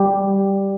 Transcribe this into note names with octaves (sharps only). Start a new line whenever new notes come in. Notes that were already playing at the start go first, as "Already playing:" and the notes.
Already playing: G3